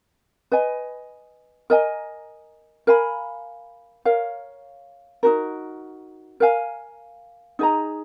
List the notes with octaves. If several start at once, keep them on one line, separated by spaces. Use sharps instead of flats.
B4 D#5 G#5
A#4 D#5 G#5
A#4 F5 G#5 B5
A#4 C#5 F5
D#4 F#4 A#4
A#4 F5 G#5
D#4 G#4 D#5 A#5